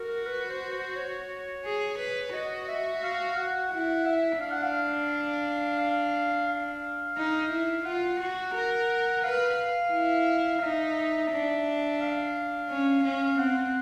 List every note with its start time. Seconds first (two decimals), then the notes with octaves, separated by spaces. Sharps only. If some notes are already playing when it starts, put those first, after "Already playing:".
Already playing: F#4 A#4
0.26 B4
0.50 C5
0.73 C5
0.96 C#5
1.65 G#4
1.99 B4
2.34 F#4 D#5
2.69 E5
3.03 F5
3.37 F#5
3.72 E4 F#5
4.06 E5
4.40 D4 F5
4.52 F#5
4.63 F5
5.79 F5
6.48 F5
7.17 D#4
7.52 E4
7.86 F4 F#5
8.20 F#4
8.55 A#4
9.24 B4 F5
9.93 E4
10.62 D#4 E5
11.31 D4
12.01 F5
12.69 C#4
13.04 C#4
13.39 C4 F#5